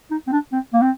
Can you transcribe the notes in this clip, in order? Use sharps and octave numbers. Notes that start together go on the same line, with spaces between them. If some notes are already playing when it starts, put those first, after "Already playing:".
D#4
C4
D4
C4
A#3
C4